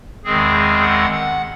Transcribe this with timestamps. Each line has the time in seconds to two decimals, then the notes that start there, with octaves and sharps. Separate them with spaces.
0.24 E2 D#3 G#3 C4 G#4
0.82 F#5
1.12 F#5